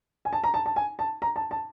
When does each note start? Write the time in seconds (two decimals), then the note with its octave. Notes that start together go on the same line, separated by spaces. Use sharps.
0.25 G#5
0.33 A5
0.44 A#5
0.54 A5
0.66 A5
0.76 G#5
0.99 A5
1.22 A#5
1.36 A5
1.51 A5